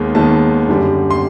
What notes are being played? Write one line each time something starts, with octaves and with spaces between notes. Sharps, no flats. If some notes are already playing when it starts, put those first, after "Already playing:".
Already playing: D#2 D#3 G#3 B3
D#2 D#3 G#3 B3 A5
F#2 D3 G3
C6